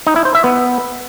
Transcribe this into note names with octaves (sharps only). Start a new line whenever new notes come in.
D#4
E4
C5
E5
B3